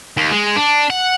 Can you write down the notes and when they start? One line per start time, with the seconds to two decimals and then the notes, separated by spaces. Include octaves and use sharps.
0.17 D#2
0.31 G#3
0.56 D4
0.90 F#5